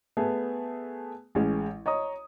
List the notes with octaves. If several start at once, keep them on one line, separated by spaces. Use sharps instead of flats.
A3 B3 G#4
A1 G#3 C#4
C#5 D#5 A#5 D#6